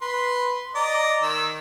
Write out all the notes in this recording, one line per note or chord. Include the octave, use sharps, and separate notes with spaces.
B4 C6
D5 D#5 A#5
D#3 E6